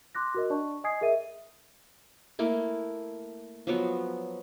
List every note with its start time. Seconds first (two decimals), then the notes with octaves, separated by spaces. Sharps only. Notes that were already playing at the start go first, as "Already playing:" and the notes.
0.15 C6 D6 F#6 A#6
0.34 F#4 A#4 D#5
0.50 D4 D5 A5 C#6
0.84 D#5 G#5 D#6 G#6 C7
1.01 G#4 A#4 E5 D#7
2.39 A3 A#3 E4
3.67 F3 F#3 B3